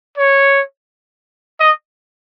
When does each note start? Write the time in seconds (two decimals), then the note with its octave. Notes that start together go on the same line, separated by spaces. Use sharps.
0.18 C#5
1.60 D#5